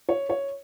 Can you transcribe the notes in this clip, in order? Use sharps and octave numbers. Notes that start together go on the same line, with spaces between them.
C#5
C#5